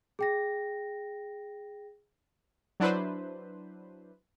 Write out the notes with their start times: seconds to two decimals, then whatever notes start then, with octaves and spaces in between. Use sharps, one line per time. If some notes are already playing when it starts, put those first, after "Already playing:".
0.19 G#4 G5 A#6
2.80 F#3 D4 E4 B4 C5